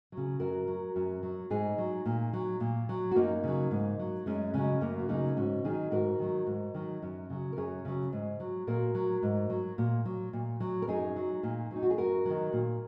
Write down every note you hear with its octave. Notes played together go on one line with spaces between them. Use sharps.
C#3 F#3
F#2 F#4 A#4
F#3
F#2
F#3
G#2 D#4 G#4
F#3
A#2
F#3
A#2
F#3
F#4
F#2 A#3 D#4
C#3 F#3
G#2
F#3
F#2 G#3 C#4
C#3 F#3 G#3 C#4
F#2 A#3
F#4
C#3 F#3 A#3 D#4
G#2 C#4 F#4
D#3 F#3 D#4 G#4
G#2 F#4 A#4
D#3 F#3
G#2
D#3 F#3
F#2
C#3 F#3
A#4
F#2 G#4 C#5
C#3 F#3
G#2
F#3
A#2 F#4 A#4
F#3
G#2
F#3
A#2
F#3
A#2
F#3
A#4
F#2 D#4 G#4
F#3
A#2
F#3 D#4
F#4
G#4
F#2 F#4 A#4
D#3 F#3
A#2